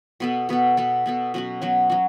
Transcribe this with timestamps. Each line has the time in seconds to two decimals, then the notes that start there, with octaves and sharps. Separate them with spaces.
0.20 B2 B3 A4
0.49 B2 B3 A4
0.77 B2 B3 A4
1.06 B2 B3 A4
1.34 B2 F#3 C#4 F#4
1.62 B2 F#3 C#4 F#4
1.90 F#3 C#4 F#4